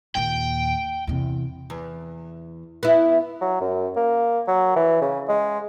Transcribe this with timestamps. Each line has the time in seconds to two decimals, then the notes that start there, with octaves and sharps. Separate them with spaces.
0.15 D#2 A#2 G5
1.07 E2 C3
1.70 E2
2.83 B3 E4
3.41 F#3
3.61 F#2
3.96 A#3
4.48 F#3
4.76 E3
5.01 C#3
5.29 G#3